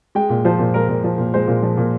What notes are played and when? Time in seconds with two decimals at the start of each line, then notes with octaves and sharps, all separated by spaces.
0.15 G#3 G5
0.29 A#2
0.45 F3 C5
0.59 A#2
0.74 G#3 A#4
0.88 A#2
1.04 F3
1.18 A#2
1.34 G#3 C5
1.48 A#2
1.63 F3
1.77 A#2